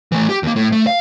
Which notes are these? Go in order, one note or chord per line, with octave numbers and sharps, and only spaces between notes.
E3 A3
G4
D#2 A#3
A2
A3
F5